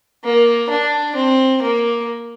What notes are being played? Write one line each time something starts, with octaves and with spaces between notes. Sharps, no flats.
A#3
D4
C4
A#3